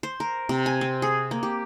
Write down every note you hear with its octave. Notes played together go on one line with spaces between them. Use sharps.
C5
A#4
C3
G#5
C4
G#4
A#3
G4